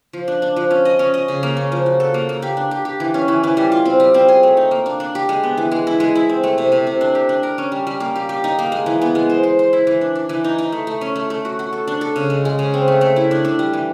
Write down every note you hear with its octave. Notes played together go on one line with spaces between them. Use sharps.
F3
D4
D4
F3
C#4
D#5
C#4
D#5
C#3
A#3
C#4
F3
F#4
A4
A#3
A#3
G4
D4
G4
G4
E3
C#4
E3
E3
G3
F4
C4
G3
C4
G#4
A3
D#4
A#3
D4
D4
G4
G#3
B3
E3
G#3
E4
G#3
E4
C4
A3
C3
C3
C3
D4
G4
D4
A#4
C#4
G3
G3
A#3
G4
G4
D#4
A#3
G#3
E3
B3
G#3
C5
C5
C5
E4
E3
D4
D4
E3
D#4
D#4
A3
A3
C#4
A3
A3
F#4
F#4
A4
D4
A4
C#3
G#3
G#3
C#3
C4
A3
A3
E4
D4
D4
G3
E3